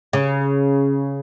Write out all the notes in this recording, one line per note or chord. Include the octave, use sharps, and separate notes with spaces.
C#3